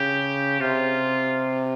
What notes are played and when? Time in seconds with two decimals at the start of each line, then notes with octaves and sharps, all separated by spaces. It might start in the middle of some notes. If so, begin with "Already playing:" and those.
Already playing: C#3 G4
0.60 C3 F4